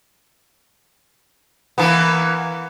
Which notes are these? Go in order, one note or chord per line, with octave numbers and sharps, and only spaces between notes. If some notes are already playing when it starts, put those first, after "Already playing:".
E3 A#3 B3